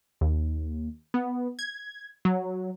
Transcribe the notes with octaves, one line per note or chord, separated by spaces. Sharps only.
D#2
B3
G#6
F#3